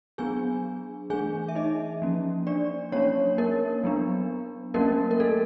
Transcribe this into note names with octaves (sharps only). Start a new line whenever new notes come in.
F#3 B3 D4 G#4 G#5
E3 A3 D4 G#4 G#5
E5
D#4 D#5
F3 A#3 C#4
D4 D5
F#3 A#3 C#4 D4 C#5
A#3 A#4
F#3 B3 D4
F#3 A3 A#3 C#4 A#4
A#4
A3 A4